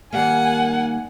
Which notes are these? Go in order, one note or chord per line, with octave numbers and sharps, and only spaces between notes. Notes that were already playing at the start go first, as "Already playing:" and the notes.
D#3 G3 A#3 F#5 G#5